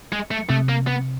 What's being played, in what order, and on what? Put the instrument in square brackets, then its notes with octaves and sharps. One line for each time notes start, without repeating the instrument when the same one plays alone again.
[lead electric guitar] G#3
A3
[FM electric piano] C3 [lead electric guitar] A3
[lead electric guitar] A#3
B3